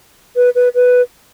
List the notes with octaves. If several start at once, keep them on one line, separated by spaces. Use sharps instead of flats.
B4
B4
B4